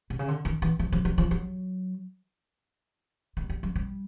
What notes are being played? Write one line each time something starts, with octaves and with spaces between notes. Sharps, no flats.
C3
C#3
D3
D#3
E3
F3
F3
F#3
F3
F#3
G3
G3
F#3
G3